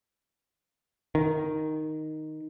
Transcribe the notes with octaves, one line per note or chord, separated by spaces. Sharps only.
D#3